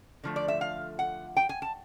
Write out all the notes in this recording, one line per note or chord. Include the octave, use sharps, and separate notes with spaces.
D3 F3 A3
D5
E5
F5
F#5
G5
G#5
A5